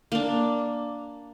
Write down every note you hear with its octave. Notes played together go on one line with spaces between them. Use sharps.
A#3 D4